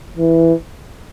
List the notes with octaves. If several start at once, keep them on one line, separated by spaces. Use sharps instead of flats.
E3